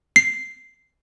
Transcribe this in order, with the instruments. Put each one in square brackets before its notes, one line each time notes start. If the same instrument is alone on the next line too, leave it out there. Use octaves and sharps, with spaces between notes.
[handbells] C7